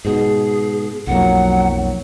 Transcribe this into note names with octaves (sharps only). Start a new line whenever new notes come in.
G#2 B2 G#4
B1 F2 F#3 A#3 F#5